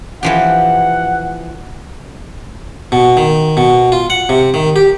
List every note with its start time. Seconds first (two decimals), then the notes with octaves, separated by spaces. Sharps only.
0.23 E3 F3 G4 F#5
2.92 B2
3.17 D#3
3.57 B2
3.92 F4
4.10 F#5
4.29 C3
4.54 D#3
4.76 G4